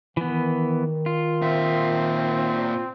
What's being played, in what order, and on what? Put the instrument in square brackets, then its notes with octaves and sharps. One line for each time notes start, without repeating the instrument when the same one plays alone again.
[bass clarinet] D#3 [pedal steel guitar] E3 B3
[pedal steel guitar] F4
[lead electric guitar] A#2 E5 [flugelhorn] C4